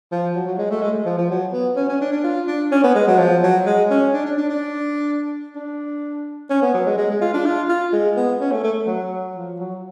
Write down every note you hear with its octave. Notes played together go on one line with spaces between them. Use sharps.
F3
F#3
F#3
G#3
A3
G#3
F3
F3
F#3
B3
C#4
C#4
D4
D4
F4
D4
C#4
B3
G#3
F#3
F3
F#3
G#3
C#4
D4
D4
D4
D4
D4
C#4
B3
F#3
G#3
G#3
G#3
F4
D4
F4
F4
G#3
B3
C#4
A3
A3
F#3
F3
F#3